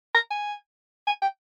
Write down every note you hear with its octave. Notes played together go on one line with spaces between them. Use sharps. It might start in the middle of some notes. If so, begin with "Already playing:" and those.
A#5
G#5
G#5
G5